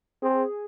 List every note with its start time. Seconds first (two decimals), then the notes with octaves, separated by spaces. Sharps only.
0.22 C4 G#4